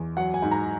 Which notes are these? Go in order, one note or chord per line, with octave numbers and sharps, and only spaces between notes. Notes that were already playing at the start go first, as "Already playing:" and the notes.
Already playing: E2
F#3 F#5
G#5
G#2
A#5